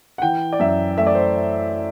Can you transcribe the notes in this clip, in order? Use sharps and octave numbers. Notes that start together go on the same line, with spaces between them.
F#5
E3 G5
D5
F#2 E5
A3 E5
D5
C5